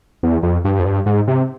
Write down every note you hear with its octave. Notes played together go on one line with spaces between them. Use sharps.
E2
F2
G2
F2
G2
G#2
C3